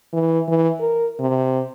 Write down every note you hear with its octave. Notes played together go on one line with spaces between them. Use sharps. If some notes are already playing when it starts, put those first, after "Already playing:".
E3
E3
A#4
C3